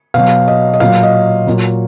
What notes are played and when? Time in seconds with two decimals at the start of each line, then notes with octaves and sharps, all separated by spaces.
0.14 B2 F#3 F5
0.48 D#5
0.74 D#5
0.80 A#2 F#3 F5
1.03 D#5
1.47 A#2 F#3